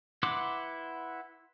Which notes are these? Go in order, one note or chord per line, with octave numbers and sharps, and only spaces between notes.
E4 B4 F#5 C6 D6